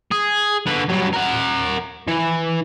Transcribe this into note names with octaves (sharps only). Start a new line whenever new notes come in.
G#4
D3 B4
G2 F#3
A#4 F#5
E3